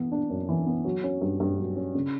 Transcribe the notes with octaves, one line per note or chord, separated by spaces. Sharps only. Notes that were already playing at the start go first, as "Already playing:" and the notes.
Already playing: E3 B3
D4
F#2
E3
B3
F#3
C#4
G2
G2
F#3
C#4
C#3